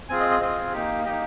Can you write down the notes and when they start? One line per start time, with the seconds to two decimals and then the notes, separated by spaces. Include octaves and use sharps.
0.09 C4 F4 G#4 G#5
0.20 D#5
0.30 D#5
0.41 C4 F4 G#4 D#5
0.73 A#3 D#4 G4
1.04 A#3 D#4 G4 D#5